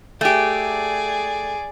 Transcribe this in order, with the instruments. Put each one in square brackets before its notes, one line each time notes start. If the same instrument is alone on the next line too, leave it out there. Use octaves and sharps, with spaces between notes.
[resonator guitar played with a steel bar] A3 G4 [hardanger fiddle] G#4 D5